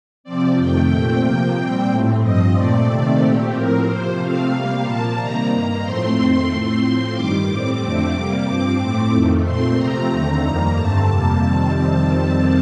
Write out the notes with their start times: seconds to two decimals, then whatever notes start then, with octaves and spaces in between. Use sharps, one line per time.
0.24 C3 F3 C4 D5
0.56 F2 C3 D#3 A3 G5
0.89 A#2 A3 C4 G5
1.22 C3 F3 A#3
1.55 A#2 G3 C4 G5
1.88 A2 A3 C4
2.21 G2 F3 C4 D#5
2.54 A#2 A3 C4 D5
2.86 C3 D#3 A3 C4
3.19 A#2 A3 C4 G4
3.51 A2 F3 C4 A#4
3.85 C3 F3 A#3 C5
4.18 C3 F3 A3 C4 F5
4.50 C3 G3 A#3 F5
4.83 A#2 F3 A#3 A5
5.16 C3 D#3 G3 A#3 A#5
5.49 G2 D#3 A#3
5.82 A2 F3 A3 C4 C6
6.15 F2 D#3 A3 C4
6.47 A2 A3 C4 C6
6.80 A2 F3 C4
7.13 G2 D#3 G3 D6
7.46 A2 G3 C4
7.79 F2 D3 A3 C4 D6
8.11 C3 G3 A#3
8.44 G2 F3 C4 D6
8.78 A2 A3 C4
9.11 F2 D#3 A3
9.43 A#2 A3 C4 C6
9.76 C3 F3 A3 C4 A#5
10.08 D#2 D3 A3 C4
10.42 F2 D#3 G3 A#3
10.74 G2 D3 A3 C4 A5
11.07 F2 C3 G3 A#3
11.40 F2 C3 D#3 G3 C4